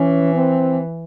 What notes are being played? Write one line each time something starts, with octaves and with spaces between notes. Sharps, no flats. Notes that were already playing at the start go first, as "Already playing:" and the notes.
Already playing: E3 C#4
C4